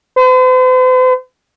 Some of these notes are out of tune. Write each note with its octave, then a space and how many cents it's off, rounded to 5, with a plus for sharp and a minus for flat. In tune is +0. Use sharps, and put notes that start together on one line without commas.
C5 -45